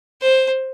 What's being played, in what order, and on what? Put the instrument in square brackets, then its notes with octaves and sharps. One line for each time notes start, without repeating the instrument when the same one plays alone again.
[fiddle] C5